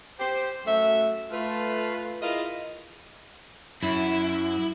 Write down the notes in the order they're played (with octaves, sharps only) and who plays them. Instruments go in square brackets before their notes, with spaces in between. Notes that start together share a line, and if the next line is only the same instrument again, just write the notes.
[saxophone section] G4 C5
F#2 A3 E5
A3 F4 B4
E4 F4 G#4 A#4 D#5 F5
[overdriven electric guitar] F#2 [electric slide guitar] E4